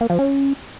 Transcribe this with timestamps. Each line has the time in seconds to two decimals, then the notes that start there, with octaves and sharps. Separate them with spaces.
0.01 A#3
0.10 F3
0.19 C#4